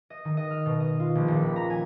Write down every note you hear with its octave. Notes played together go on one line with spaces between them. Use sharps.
D#5
D#3
D#5
F6
B2
D#5
F4
A#1
D#1
B5
A#5
G#5